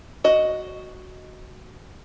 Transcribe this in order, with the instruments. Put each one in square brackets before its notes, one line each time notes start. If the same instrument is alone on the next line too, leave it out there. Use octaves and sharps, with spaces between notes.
[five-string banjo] F#4 D#5